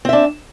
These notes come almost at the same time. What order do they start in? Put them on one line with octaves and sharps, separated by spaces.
C4 E5 D4